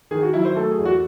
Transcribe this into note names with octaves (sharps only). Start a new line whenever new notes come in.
D#3 G#4
F#4
F#3 E4
C5
A3 A4
G#4
E2
F#4